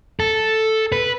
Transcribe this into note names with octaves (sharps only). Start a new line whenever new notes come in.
A4
B4